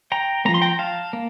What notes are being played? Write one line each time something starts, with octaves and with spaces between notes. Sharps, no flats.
G5 A#5
F3 A#3 A#5
C6
G5 A#5
F5 A5
A#3